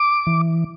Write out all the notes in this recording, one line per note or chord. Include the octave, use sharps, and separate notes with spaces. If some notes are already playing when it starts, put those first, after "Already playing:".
Already playing: D6
E3